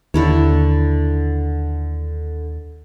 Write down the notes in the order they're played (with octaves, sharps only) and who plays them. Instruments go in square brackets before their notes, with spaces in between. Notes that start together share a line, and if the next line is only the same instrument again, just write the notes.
[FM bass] D#2 [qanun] D3 E4 C#5